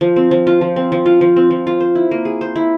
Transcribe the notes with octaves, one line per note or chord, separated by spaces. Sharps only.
F3
C4
F3
F4
F3
C4
F3
F4
F3
C4
F3
F4
C5
E4
A#3
G#4
C5
E4